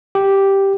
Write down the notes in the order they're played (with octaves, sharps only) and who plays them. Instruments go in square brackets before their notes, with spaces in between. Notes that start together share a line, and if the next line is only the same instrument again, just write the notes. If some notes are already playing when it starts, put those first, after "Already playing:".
[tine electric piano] G4